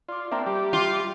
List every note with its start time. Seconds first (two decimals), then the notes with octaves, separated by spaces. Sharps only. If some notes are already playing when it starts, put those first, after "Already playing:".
0.09 F4 D5 D6
0.32 A#3 C4 D4 E5 G5 A#5
0.46 G3 G4
0.73 F4